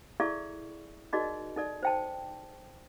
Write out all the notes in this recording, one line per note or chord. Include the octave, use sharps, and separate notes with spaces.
E4 G#4 A4 D5 E5 C#6
D#4 F#4 G#4 A#4 D5 D#5
D#4 A4 D5
C5 G5 A5